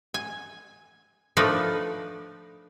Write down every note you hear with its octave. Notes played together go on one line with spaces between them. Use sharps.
G#5
F3 A3 D4 D#4 A#4 B4